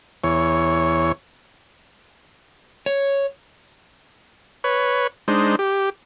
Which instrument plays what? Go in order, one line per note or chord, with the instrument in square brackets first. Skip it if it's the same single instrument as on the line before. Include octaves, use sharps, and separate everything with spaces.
[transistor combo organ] E2 C#5
[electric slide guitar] C#5
[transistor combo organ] B4 C#5
G#3 D4 D#4 C5
G4